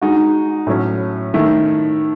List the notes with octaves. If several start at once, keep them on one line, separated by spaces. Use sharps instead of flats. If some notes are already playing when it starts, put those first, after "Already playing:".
G#3 D#4 F#4
A2 F#3 A3 C#4
D#3 A3 E4